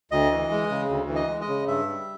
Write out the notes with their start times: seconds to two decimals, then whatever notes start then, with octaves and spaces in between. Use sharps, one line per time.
0.12 D2 D#5
0.31 E3
0.51 G#3
0.70 C#3
0.89 D2
1.09 E3
1.16 D#5
1.29 G#3
1.41 D#5
1.48 C#3
1.67 G2 E5
1.88 G3